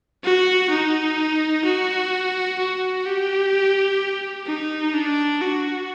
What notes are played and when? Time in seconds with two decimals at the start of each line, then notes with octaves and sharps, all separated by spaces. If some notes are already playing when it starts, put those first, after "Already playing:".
0.24 F#4
0.70 D#4
1.65 F#4
2.59 F#4
3.06 G4
4.47 D#4
4.94 D4
5.42 F#4